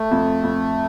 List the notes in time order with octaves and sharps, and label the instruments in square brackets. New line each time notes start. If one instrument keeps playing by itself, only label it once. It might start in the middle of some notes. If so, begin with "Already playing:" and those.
Already playing: [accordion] A3
[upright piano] F2
F2